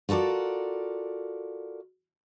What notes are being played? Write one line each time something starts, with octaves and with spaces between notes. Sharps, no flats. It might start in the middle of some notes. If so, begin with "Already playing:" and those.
F4 F#4 A4 A#4 D5